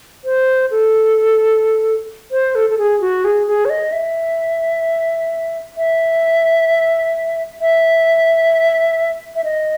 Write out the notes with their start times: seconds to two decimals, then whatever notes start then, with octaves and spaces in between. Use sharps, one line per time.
0.25 C5
0.71 A4
2.31 C5
2.55 A4
2.70 A4
2.78 G#4
3.01 F#4
3.24 G#4
3.47 G#4
3.65 C#5
3.70 D#5
3.92 E5
5.77 E5
7.61 E5
9.36 E5
9.44 D#5